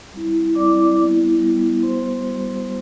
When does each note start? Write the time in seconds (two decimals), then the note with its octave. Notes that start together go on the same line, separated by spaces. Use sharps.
0.13 G3 C4 E4
0.55 G3 C4 E4 D5 D6
0.98 G3 B3 E4
1.41 G3 B3 E4
1.83 G3 B3 F#4 C5 C6
2.25 G3 B3 F#4